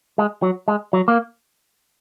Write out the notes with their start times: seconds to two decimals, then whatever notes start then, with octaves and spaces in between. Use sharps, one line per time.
0.18 G#3
0.42 F#3
0.68 G#3
0.93 F#3
1.08 A#3